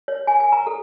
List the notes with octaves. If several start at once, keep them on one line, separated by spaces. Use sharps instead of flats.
C#5
G#5
G#5
A#5
A4